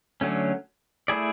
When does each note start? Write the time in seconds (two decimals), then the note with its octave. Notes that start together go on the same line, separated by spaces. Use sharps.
0.21 D3 F#3 A3 C#4
1.08 A3 E4 G#4 D5